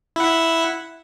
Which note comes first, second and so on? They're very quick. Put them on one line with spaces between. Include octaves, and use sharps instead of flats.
E4 F#5 E5